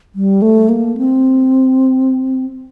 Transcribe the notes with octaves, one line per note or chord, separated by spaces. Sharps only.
G3
A3
A#3
C4